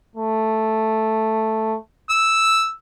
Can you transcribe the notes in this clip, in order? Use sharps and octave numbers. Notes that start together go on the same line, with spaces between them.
A3
E6